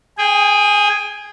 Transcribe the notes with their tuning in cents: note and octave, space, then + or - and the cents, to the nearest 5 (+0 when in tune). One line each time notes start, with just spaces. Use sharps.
G#4 +0 G5 +35